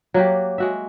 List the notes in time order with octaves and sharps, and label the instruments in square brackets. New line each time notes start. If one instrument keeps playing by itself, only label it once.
[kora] F#3 A#3 F#4 G4
G#3 F#4 E5